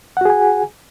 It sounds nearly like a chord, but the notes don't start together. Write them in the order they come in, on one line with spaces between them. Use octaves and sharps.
F#5 F#4 G#4 G#5